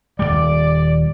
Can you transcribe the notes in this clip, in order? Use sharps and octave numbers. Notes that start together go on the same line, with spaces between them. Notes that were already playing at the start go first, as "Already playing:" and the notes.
D#1 D#2 G3 D5